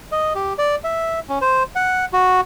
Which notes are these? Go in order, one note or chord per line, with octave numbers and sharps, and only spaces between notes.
D#5
G4
D5
E5
C#4
C5
F#5
F#4